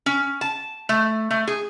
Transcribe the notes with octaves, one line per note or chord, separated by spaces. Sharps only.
C#4
A5
A3
A3
G#4